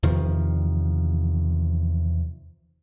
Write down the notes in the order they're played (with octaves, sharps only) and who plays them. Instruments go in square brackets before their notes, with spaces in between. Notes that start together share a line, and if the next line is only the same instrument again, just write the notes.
[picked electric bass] E2 C3 D#3 F3